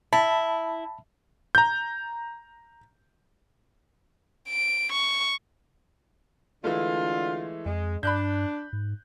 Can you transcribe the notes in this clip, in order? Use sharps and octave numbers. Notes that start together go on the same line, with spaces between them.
E4 A5 B5
A#5 G6
D7
C#6
D3 E3 G#3 A3 F4
F2 G#3
G2 D4 B5 F#6 G6
G#2